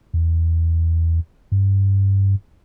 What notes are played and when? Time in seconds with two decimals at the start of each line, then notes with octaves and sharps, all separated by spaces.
0.14 E2
1.52 G2